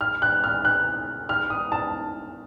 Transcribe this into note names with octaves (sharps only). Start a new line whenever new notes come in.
F6
F#6
F6
F#6
F6
D#6
A5